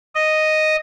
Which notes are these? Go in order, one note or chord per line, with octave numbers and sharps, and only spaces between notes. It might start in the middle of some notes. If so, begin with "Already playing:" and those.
D#5